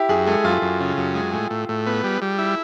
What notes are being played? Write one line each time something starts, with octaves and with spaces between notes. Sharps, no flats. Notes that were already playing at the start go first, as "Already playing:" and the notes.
Already playing: E4 G4
F#2 G#4
G#3 A4
F#2 F4
F#2
C#3
F#2
G#3
A2
A2
A2
B3
G3
G3
E4